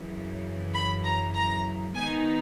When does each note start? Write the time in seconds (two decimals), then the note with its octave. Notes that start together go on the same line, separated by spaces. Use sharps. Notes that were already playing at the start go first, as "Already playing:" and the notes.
Already playing: F#2 C#3 E3
0.74 B5
1.04 A#5
1.35 A#5
1.95 D#3 G#3 B3 D#4 G#5